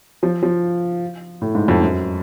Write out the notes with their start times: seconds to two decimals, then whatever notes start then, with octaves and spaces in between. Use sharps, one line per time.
0.23 F3
0.43 F3
1.42 A2
1.55 G#2
1.68 F2
1.82 F#2